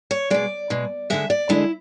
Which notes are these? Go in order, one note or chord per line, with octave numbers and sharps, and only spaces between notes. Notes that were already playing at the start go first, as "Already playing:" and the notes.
C#5
B2 G#3 D5
B2 G#3
D2 D3 G#3 E5
D5
D2 D3 G#3 E4